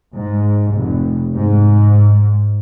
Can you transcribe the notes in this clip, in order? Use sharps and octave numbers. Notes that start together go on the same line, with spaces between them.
G#2
F1
G#2